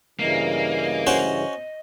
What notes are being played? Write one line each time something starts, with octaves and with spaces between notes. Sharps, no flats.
G2 C#3 E3 A#3 D#5
C#4 F#4 C5